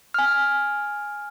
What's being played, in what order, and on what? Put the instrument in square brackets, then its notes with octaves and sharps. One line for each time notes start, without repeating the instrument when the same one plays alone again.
[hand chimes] G#5 F6